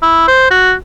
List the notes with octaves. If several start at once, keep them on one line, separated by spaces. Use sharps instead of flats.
E4
C5
F#4